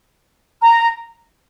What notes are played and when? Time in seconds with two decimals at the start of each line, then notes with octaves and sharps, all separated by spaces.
0.61 A#5